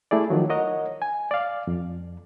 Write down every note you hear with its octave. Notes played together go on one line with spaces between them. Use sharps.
A3 E4 G#4 D5
D#3 F3 F#3
A#4 C#5 D#5 F#5
G#5
D5 F5
F2